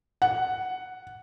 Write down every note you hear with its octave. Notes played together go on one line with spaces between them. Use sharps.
F#5